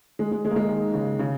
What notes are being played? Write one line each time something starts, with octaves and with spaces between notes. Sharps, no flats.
G#3
G#3
G#3
A#3
G#3
D#3
C#3
C#3